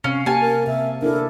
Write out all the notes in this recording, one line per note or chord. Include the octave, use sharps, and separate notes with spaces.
C3 C#4 F5
A#3 G4 G#5 A5
A#4
C3 E5
D4 E4 A4 A#4